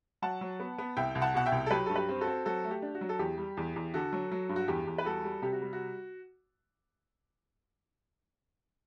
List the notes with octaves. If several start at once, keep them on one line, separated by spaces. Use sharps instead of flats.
F#3 F#5 A5
F#3
B3
B3
C2 E5 G5
C2
F#5 A5
B2 F#5
E5 G5
C2
A4
F#3 G4 B4
G2 A4
G4 B4
C4
F#4 A4
C4
F#3 F#4 A4
A3
G4
D4
F#4
F#3
A4
E2 G4
G3
E2
E2
D3 F#4 A4
F#3
F#3
G2
F#4
E2 G4
E2
B4
G3 F#4 A4
G3
C3 G4
F#4
G3
F#4